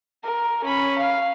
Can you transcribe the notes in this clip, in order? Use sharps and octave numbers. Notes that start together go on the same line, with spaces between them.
A#4
C#4 B5
F5